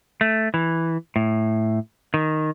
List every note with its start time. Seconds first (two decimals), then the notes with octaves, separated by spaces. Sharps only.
0.21 A3
0.54 E3
1.16 A2
2.14 D#3